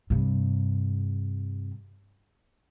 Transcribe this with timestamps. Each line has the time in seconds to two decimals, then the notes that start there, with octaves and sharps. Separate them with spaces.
0.10 G2 C3